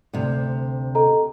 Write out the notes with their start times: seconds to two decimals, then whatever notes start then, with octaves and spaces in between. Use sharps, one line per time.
0.13 D2 C3
0.95 A4 D#5 A#5